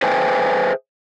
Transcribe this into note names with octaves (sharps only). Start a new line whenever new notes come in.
G#4 B4 C5 E5 G5 G#5